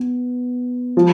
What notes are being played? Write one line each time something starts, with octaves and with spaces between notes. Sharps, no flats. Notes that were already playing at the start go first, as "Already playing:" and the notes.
Already playing: B3
F3